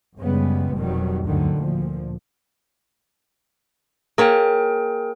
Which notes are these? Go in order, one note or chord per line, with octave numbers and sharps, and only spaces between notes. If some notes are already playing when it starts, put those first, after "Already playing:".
F#2 C#3 G3 G#3 B3
F1 F2 B2 D#3 F#3 G3
D2 G2 D3 D#3 F#3
D2 A#2 F3
A#3 G#4 A#4 C#5 G5